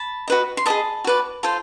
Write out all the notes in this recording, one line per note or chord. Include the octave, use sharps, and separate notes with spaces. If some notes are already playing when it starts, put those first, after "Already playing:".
Already playing: A5 B5
F#4 B4 D#5
C6
G#4 C5 D#5 A5 B5
F#4 B4 D5
F4 A4 C5